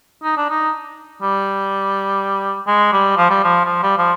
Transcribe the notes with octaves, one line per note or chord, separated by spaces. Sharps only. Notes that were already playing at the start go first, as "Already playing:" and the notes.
D#4
D4
D#4
G3
G#3
G3
F3
G3
F3
F3
G3
F3